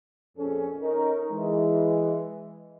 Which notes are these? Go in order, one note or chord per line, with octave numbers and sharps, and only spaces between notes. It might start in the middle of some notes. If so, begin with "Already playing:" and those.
F2 A#2 F3 C#4 G#4 A4
C#4 D#4 A#4
E3 G#3